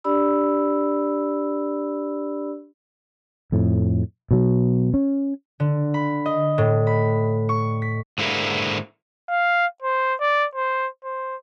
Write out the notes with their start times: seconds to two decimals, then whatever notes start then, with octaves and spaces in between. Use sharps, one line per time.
0.04 D4 G4 D5 B5 E6
3.52 F2 A2
4.31 B2 F#3
4.94 C#4
5.60 D3
5.94 B5
6.26 D#5
6.58 A2
6.87 B5
7.49 C#6
7.82 B6
8.18 G#2 D3 A#3 E4
9.29 F5
9.82 C5
10.20 D5
10.55 C5
11.04 C5